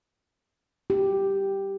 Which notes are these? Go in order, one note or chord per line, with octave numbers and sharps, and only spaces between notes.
G4